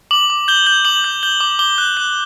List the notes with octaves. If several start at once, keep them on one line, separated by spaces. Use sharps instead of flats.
D6 F#7
D6
G6 G7
G6
D6 F#7
G6
G6 G7
D6
D6 G7
F#6
F#6